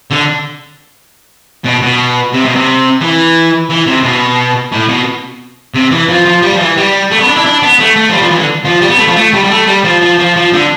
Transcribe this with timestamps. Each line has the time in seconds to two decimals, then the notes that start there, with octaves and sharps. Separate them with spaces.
0.11 D3
1.64 B2
1.82 B2
2.33 C3
2.45 B2
2.55 C3
3.01 E3
3.69 E3
3.86 C3
4.03 B2
4.72 A2
4.88 B2
5.74 C3
5.91 E3
6.09 F3
6.25 F3
6.42 G3
6.52 F3
6.60 E3
6.77 G3
7.11 A3
7.19 B3
7.27 D4
7.37 E4
7.45 D4
7.62 B3
7.80 A3
7.96 A3
8.09 F3
8.13 G3
8.22 F3
8.31 E3
8.39 D3
8.65 F3
8.82 G3
8.90 B3
8.99 A3
9.08 F3
9.16 A3
9.33 G3
9.44 G3
9.51 A3
9.67 G3
9.84 F3
10.01 F3
10.19 F3
10.36 F3
10.53 D3